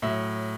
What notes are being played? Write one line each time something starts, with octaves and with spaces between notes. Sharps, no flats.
A2 F#3 E5